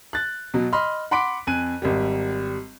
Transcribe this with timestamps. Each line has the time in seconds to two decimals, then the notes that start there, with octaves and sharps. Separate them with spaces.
0.13 F#6 A6
0.54 B2 F#3
0.73 D#5 B5 C6 F6
1.11 F#5 B5 C6 D6 B6 D7
1.47 F2 G#5 F#6 D#7
1.82 G#1 G3